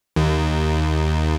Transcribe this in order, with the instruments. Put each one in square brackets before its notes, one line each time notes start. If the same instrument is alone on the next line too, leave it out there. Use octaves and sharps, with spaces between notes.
[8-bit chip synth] D#2